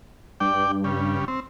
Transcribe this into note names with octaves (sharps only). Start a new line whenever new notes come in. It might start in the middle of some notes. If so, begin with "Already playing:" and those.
G2 D5 G5
C#3 G3
C4